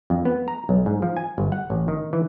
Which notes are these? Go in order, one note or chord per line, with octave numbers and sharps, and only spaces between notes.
F2
B3
A#5
B1
G#2
F3
G#5
G1
F#5
A1
D#3
E3